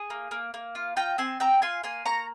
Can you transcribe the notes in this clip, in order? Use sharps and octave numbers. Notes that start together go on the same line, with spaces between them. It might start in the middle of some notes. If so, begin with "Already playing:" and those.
Already playing: G#4
A#3
A#3
A#3
F4
F4 G5 A#5
C4 G#5 C6
C4 G5 A#5
F4 G#5 C6
A#3 G#5 C6
A#3 A#5 C#6